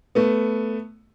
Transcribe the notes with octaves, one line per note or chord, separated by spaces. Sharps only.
A3 B3